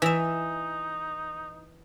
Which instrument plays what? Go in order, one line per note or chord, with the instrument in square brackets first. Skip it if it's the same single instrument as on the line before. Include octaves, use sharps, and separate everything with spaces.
[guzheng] E3 E5 [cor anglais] D#4